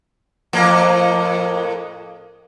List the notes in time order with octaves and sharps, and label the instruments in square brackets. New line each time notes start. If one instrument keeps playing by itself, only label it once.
[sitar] F2 A2 A#3